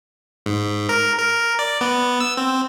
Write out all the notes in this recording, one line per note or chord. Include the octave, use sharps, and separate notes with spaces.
G#2
A#4
A#4
D5
B3
E6
C4